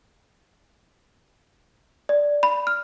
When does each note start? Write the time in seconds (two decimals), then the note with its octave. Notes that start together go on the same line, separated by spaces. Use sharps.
2.09 D5
2.43 B5
2.67 F6